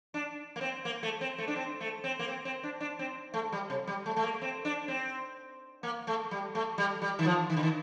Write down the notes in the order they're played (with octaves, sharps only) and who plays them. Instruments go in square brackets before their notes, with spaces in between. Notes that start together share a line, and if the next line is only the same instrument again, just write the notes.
[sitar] D4
A#3
C4
A#3
A3
C4
A3
D4
C4
A3
C4
A#3
C4
C4
D4
D4
C4
A3
G3
C3
G3
A3
A3
A#3
C4
D4
C4
A#3
A3
G3
A3
G3
G3
D#3
F3
D#3
D3
D#3